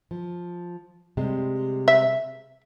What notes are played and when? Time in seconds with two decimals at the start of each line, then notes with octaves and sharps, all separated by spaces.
0.11 F3
1.17 C3 G3 G#3
1.88 E5